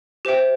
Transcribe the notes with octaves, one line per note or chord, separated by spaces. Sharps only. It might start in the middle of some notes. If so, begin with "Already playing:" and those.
G4 C5 E5 G5